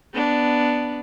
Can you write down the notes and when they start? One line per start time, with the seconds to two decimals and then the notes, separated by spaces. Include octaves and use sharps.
0.14 B3 D4